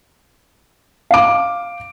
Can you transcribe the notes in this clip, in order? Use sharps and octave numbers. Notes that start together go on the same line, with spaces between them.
F5 D6